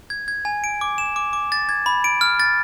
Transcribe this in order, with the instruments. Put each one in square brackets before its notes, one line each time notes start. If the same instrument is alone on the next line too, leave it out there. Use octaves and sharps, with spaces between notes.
[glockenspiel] G#6
G#6
G#5
D7
D6
E7
D6
D6
A6
G#6
B5
D7
F6
A6